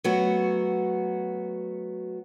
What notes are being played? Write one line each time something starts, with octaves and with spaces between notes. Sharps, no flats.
F#3 A3 B3 F#4